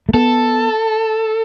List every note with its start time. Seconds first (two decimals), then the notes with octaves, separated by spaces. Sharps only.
0.09 A3
0.14 B3 A4